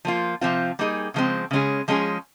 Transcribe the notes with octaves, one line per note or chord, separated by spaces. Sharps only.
F3 A#3 F4
C3 F3 C4 F4
G3 A#3 D#4 G#4
C#3 F3 G#3 C4
C#3 G#3 C#4 G#4
F3 G#3 C#4 G#4